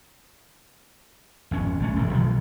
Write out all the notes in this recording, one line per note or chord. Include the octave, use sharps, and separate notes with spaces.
G#1 F2 C#4
A#1 A3 C#4
E1 G2 D#3
B1 D#3 F3